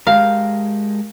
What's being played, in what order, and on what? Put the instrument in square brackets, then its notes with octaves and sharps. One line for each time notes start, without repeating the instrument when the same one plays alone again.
[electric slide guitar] G#3 G4 A#4 [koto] F5